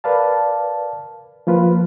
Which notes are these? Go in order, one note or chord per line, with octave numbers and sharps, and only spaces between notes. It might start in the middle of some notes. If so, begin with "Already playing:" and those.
A#4 B4 D5 F5 A5
F3 A#3 F4 B4